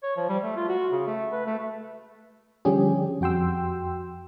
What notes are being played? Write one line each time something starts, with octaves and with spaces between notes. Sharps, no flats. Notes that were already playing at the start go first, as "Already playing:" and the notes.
C#5
F3
G3
A3
F4
F#4
C#3
A3
B4
A3
D3 F3 G3 C#4 G4 G#4
F2 F#4 G5 C6 E6